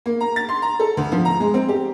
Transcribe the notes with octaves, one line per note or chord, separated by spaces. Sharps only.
A#3
A#5
A6
C6
A#5
A4
D2
F3
A#5
G#3
C4
G4